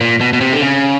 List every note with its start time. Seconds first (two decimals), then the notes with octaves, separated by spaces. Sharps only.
0.01 A#2
0.21 B2
0.33 B2
0.41 C3
0.53 D3
0.61 C#3